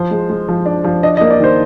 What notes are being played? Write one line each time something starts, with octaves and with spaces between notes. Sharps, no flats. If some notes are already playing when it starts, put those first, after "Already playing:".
Already playing: F3 C5
G#3
G#3
F3
D4
F3
D4 D#5
D#5
A#3
D5
D#3 C5